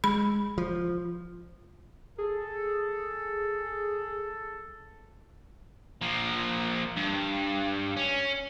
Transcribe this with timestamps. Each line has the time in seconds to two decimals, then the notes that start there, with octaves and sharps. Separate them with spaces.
0.04 G#3 B5
0.58 F3
2.18 G#4 A4
6.02 F3 A#3
6.96 G2
7.97 C#4